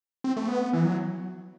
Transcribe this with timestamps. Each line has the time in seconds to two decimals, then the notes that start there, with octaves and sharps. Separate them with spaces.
0.24 C4
0.37 A3
0.48 B3
0.73 E3
0.85 F#3